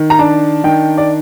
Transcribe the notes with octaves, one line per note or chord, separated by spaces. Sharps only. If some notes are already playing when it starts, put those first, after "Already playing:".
Already playing: D#3
A#5
D4 A5
D#3 G5
D5